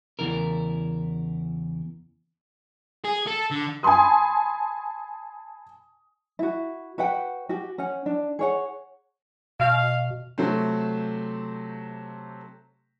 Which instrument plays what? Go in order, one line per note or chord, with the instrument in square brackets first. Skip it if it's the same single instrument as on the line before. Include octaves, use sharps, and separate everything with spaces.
[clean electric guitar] E2 C#3 E4 A#4
[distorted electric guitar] G#4
A4
D3
[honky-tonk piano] G#5 A5 B5 C6 D#6
[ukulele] E4 F#4
F#4 B4 F#5 G5
F#4 G4
C#4 F#5
D4
G#4 C#5 F#5
[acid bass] B2 [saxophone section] F5
[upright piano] C3 F#3 A3 C4